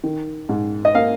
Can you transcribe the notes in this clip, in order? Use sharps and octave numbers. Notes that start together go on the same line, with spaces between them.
D#3
G#2
D#5
A#3 F5